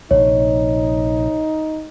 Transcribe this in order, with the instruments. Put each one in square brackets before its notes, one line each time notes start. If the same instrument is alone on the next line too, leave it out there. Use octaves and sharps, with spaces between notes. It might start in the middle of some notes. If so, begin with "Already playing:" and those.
[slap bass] A#1 C3 [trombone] D#4 [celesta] C#5